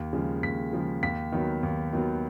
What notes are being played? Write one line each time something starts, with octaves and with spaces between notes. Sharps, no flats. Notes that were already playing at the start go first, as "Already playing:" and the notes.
Already playing: D#2
C#3 F3 G#3
D#2 B6
C#3 F3 G#3
D#2 B6
D#3 F#3 B3
D#2
D#3 F#3 B3